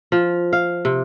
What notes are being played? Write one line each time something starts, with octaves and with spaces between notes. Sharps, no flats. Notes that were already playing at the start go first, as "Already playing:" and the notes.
F3
F5
C3